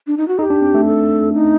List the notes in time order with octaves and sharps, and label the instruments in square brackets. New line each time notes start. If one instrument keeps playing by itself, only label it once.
[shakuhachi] D4
D#4
F#4
[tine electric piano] D#4 [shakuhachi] A4
[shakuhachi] G4
[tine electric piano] D4
C4
A3
[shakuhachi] A4
D#4